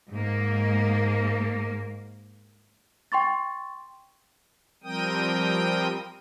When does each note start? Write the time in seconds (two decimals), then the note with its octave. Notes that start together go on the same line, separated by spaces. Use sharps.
0.11 G#2 A#3
3.12 G5 C6 C#6 A6
4.84 F3 G3 C4 A#4 G5 D#6